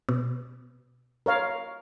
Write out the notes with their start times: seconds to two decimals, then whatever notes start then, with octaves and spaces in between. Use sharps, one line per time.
0.09 B2
1.26 A#4 C#5 F5